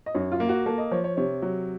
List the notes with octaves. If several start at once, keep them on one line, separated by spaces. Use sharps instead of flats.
D#5
F#2 C#5
F4
A#3
F#4
A#3 A4
D#5
F3 C#5
C#5
C3 C#5
F#3